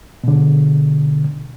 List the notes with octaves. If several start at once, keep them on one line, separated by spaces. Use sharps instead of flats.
B2 D3